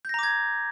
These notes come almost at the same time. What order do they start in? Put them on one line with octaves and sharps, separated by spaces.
G6 A#6 A#5 D6 G#6